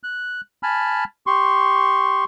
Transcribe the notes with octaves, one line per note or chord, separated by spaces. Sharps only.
F#6
G#5 A5 B5 F6
G4 C6 C#6